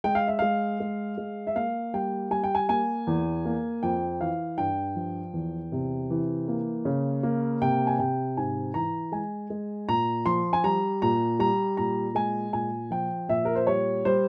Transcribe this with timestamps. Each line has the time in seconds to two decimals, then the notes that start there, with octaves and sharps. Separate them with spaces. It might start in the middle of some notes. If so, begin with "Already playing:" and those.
0.04 G#3 G5
0.15 F5
0.28 E5
0.39 G#3 F5
0.80 G#3
1.18 G#3
1.47 E5
1.56 A#3 F5
1.94 G3 G5
2.31 G3 G#5
2.44 G5
2.55 G#5
2.69 A#3 G#5
3.07 E2
3.45 A#3
3.83 F2 G5
4.21 E3 F5
4.58 G2 G5
4.96 F3
5.33 E2
5.72 C3
6.10 E3
6.48 A#3
6.85 C#3
7.23 A#3
7.62 C3 G5
7.87 G#5
7.99 C3 G5
8.37 G#2 G#5
8.74 E3 A#5
9.12 G#3 G#5
9.50 G#3
9.88 A#2 A#5
10.26 F3 C6
10.53 G#5
10.64 G3 A#5
11.02 A#2 A#5
11.39 G3 A#5
11.77 A#2 A#5
12.15 G#3 G#5
12.53 A#2 G#5
12.91 F3 G5
13.29 A#2 E5
13.45 A#4
13.55 C5
13.67 G3 C#5
14.05 G3 C5